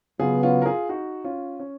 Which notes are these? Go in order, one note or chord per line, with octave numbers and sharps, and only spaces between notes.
C#3 F#3 B3 F4 G#4
C#4 F4
A#4
F4 G#4
D#4 F#4
C#4 F4
C#4